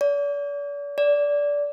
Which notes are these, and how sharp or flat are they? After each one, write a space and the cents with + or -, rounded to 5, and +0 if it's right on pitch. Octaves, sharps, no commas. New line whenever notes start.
D5 -40
D5 -20